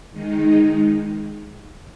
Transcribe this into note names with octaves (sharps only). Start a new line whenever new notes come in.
D#3 G#3 D#4